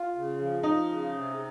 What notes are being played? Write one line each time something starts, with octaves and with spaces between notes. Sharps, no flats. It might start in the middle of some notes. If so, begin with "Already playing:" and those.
Already playing: F4
C#3
F3
F3 D#4
C#3
C3